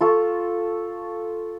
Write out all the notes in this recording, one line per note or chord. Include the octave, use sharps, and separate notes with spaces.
F4 A4 C#6